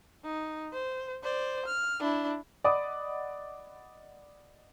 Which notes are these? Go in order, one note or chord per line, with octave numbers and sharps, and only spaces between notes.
D#4
C5
C5 D5
F6
D4 E4
D5 D#5 F#5 B5 D6 D#6